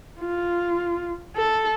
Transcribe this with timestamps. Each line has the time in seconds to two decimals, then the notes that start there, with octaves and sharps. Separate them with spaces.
0.21 F4
1.37 A4